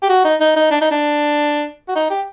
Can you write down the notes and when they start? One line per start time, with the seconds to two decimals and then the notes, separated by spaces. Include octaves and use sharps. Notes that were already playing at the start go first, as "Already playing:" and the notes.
0.03 G4
0.10 F#4
0.25 D#4
0.41 D#4
0.56 D#4
0.71 D4
0.81 D#4
0.91 D4
1.88 F#4
1.96 D#4
2.10 G4